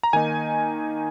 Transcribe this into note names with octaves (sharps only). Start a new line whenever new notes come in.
A#5
D#3 A#3 D#4 G#5